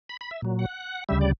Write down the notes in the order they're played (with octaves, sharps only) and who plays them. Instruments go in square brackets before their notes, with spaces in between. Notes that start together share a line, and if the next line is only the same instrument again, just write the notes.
[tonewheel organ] B5
B5
E5
A#2 F#3
F#5
D2 C#3 G3 E5
D5